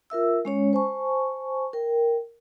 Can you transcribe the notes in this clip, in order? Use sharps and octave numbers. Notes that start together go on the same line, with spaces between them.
F4 A#4 E5 E6
G#3 C#4 C#5
C5 G#5 A5 C#6
A#4 G5